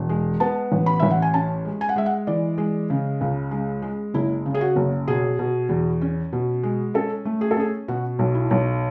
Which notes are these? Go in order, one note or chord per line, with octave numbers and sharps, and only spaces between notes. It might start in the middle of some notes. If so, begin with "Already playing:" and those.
Already playing: E1
G#3
B3 A5
A1
B5
A1 E5
F#5
G#5
C#4 A5
G#3
G#5
F#5
G#3 E5
F#5
E3 D5
G#3
C#3
C#2
G#3
G#3
F#1 E4
C#3
G#4
F#4
F#1
B2 G#4
B2
E2
C#4
B2
G#3
C#4 A4
A3
G#4
A4
C#4 G#4
B2 F#4
B1
E4
B1